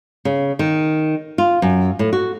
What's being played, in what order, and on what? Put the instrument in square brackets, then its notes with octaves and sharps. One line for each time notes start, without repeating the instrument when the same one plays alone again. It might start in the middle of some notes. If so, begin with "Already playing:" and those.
[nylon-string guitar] C#3
D#3
F4
F#2
A2
F#4